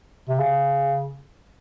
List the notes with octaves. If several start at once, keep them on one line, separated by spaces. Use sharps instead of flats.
C3
C#3